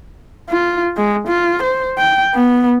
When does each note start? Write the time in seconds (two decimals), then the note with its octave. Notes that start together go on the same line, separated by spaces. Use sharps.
0.49 F4
0.97 G#3
1.28 F4
1.63 C5
1.98 G5
2.34 B3